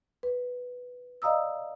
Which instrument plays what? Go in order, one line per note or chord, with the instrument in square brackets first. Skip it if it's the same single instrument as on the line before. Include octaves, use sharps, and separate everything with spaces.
[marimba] B4
D5 D#5 F5 A#5 D#6 E6